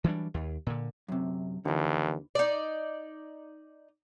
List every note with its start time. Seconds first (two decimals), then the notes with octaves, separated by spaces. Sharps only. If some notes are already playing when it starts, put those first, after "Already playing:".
0.04 E3 F#3 G3 D4
0.34 D#2
0.67 A#2 D3
1.08 F#2 C3
1.65 D#2 D3 E3
2.35 D#4 D5